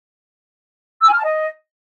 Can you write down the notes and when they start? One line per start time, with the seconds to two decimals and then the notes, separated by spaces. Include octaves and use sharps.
1.02 E6
1.07 G#5
1.13 F6
1.18 A5
1.23 D#5